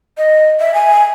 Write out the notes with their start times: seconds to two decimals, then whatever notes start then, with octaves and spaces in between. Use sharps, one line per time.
0.18 D#5
0.60 E5
0.74 G#5